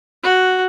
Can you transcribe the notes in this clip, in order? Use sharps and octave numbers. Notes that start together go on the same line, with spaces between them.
F#4